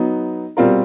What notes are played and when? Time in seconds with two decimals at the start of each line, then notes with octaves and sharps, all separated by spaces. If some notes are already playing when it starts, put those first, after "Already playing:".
Already playing: F#3 B3 D#4
0.57 B2 G3 C4 F4 A#4